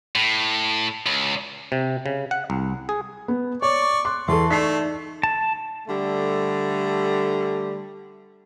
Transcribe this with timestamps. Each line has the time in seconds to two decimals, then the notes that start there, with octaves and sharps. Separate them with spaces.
0.15 A2
1.06 C#2
1.72 C3
2.06 C#3
2.31 F#5
2.50 C2
2.89 G#4
3.28 B3
3.62 C#5 D5 C#6
4.05 C6 D6 F#6
4.28 E2 A4 E5 A5 C6 C#6
4.51 A3 D#4 D5 E5 B6 C7
5.23 A5
5.87 D3 G3 A3